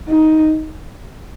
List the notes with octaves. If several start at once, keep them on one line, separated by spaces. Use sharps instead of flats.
D#4